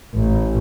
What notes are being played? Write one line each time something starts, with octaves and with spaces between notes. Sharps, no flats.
A1